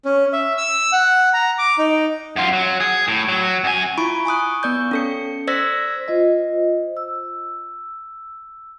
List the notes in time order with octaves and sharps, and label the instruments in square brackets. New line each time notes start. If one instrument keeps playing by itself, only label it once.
[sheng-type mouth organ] C#4
E5
E6
F#5
A#5
D6
D#4
[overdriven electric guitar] F#2 F4
F#3
G#4
A2
F#3
F#2 G#5
[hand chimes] E4 F4 B5 C#6 D7
G#5 C#6 D#6 F#6
B3 D5 G6
C#4 A4 C#7
C5 D5 E6 G#6 A#6 B6
[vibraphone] F4 C5 D#5
E6